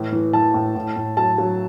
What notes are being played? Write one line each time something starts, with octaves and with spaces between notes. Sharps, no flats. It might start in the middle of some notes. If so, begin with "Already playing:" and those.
Already playing: A2 E3
E3
E3 A5
A2
A2
A2
F#3 A5
F#3